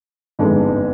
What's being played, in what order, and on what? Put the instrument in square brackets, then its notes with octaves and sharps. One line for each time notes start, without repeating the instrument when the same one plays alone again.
[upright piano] G1 F2 D3 G#3 D#4